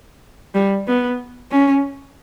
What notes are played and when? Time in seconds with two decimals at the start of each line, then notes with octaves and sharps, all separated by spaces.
0.55 G3
0.88 B3
1.52 C#4